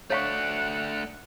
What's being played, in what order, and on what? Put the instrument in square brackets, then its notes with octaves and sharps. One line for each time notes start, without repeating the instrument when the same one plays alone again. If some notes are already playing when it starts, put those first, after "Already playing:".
[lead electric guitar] A3 D4 [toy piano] C#5 F5 C#6 [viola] F#5